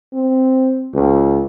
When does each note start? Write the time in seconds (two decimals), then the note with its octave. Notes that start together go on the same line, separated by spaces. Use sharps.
0.13 C4
0.94 C#2